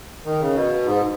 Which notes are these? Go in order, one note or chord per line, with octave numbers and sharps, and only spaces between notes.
D#3
C#3
B2
G#2